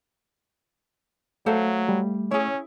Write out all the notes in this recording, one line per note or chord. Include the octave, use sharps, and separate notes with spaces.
F#3 A3 A4 C5 F5
G3
C#4 E4 G#4 C#5